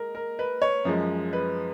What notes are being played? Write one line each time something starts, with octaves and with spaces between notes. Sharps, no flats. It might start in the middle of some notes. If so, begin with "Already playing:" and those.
Already playing: G#3 A#4
A#4
B4
C#5
F#2 F3 G#3
B4